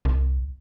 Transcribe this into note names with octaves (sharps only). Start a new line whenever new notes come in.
C2